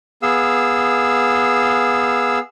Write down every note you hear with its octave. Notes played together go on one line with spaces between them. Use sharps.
B3 G#4 F5 E6